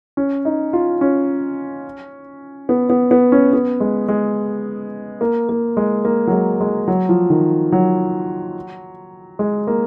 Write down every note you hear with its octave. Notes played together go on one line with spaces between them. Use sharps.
C#4
D#4
F4
C#4
B3
B3
B3
C#4
B3
G#3
G#3
A#3
A#3
G#3
A#3
F#3
G#3
G#3
F#3
F3
D#3
F#3
G#3
A#3